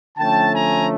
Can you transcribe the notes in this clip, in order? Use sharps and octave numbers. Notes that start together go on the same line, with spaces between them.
D3 F3 A3 C#4 G5 A5
G#5 A#5